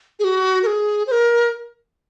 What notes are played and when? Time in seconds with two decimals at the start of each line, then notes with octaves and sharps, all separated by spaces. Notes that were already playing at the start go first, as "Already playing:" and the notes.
0.19 G#4
0.24 F#4
0.63 A#4
0.67 G#4
1.07 C5
1.12 A#4